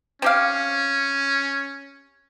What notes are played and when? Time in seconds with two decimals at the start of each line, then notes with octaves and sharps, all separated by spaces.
0.22 C4 C#4 G4 F5